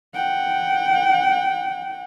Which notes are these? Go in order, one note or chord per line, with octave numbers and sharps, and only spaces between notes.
F#5 G5